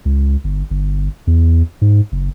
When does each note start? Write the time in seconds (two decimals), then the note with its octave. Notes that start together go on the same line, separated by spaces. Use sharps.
0.05 C#2
0.44 G1
0.70 G1
1.27 E2
1.81 G#2
2.12 F#1